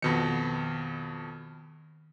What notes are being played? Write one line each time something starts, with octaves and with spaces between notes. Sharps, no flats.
F2 B2 D#3 C#7